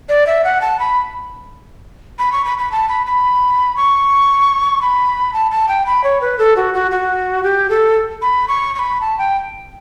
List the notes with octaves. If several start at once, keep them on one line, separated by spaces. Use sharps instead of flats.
D5
E5
F#5
A5
B5
B5
C#6
B5
B5
A5
B5
B5
C#6
B5
A5
A5
G5
B5
C#5
B4
A4
F#4
F#4
F#4
G4
A4
B5
C#6
C#6
B5
A5
G5